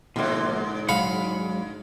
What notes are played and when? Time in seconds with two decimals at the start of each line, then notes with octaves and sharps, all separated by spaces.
0.16 G#2 B2 D3 F3 A#3
0.89 F#3 G#3 F5 F#5 B5